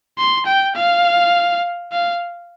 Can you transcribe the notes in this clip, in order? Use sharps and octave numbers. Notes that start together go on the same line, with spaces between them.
C6
G5
F5
F5